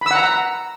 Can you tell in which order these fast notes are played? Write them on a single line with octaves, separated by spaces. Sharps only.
B5 E6 F#5 A#5